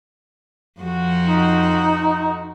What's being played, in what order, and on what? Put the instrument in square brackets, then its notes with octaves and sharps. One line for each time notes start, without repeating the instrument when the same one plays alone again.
[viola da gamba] F2 F3 F#4
[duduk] D#4